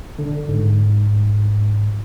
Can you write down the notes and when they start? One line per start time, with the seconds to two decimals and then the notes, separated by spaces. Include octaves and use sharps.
0.19 D3
0.48 G#2